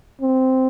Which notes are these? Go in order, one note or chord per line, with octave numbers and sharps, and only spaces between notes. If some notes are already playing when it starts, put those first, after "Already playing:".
C4